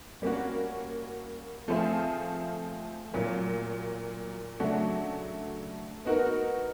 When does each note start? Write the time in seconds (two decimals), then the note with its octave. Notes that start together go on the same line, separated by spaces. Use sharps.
0.22 G3 A#3 C#4 F#4
1.68 F3 A3 C4 F4 G#4
3.14 A#2 F#3 A#3
4.60 C#3 F#3 A3 D4 F#4
6.05 B3 D#4 F#4 A#4